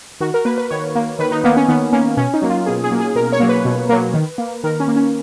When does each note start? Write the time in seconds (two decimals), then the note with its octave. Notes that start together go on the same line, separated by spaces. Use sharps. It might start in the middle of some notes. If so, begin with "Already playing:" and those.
0.21 D#3 F#4
0.34 A#4
0.45 A#3 B4
0.58 B4
0.71 D#3 C#5
0.95 A#3
1.19 D#3 B4
1.32 D#4
1.44 A#3 B3
1.57 C#4
1.69 D#3 B3
1.93 A#3 C#4
2.17 B2 C#4
2.34 D#4
2.42 F#3 A#3
2.50 F4
2.66 B2 G#4
2.84 G#4
2.91 F#3 A#3
3.00 G#4
3.15 B2 A#4
3.33 C#5
3.40 F#3 A#3
3.49 B4
3.65 B2
3.89 F#3 A#3
4.14 D#3
4.38 A#3
4.64 D#3 A#4
4.80 C#4
4.88 A#3
4.96 C#4